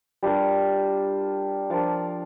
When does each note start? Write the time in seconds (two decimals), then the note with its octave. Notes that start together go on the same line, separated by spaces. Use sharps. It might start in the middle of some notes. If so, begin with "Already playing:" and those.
0.23 G3 D4 F4 A#4
1.70 F3 D4 F4 A#4